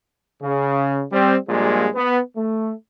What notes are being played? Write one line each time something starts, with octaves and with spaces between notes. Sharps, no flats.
C#3
G3 C4
A#1 A#2 G3 G#3
B3
A3